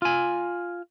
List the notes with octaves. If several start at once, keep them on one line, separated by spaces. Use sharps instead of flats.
F4 G#5